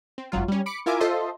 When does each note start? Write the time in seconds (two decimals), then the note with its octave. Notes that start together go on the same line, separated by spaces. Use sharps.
0.18 C4
0.32 G#1 F#2 F#3 F4
0.48 G3 C#4
0.66 B5 D6 C#7
0.86 E4 F4 A#4 E5 G#5 D6
1.00 F4 A4 C5 D#5 E5 C6